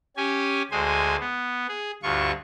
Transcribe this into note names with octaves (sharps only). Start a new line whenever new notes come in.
C#4 G4 G#5
D2 G#3 C5 G#5
B3
G#4
D2 G2 F4 C#6